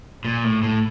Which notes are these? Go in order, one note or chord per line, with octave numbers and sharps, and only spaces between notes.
A#2
A2
A2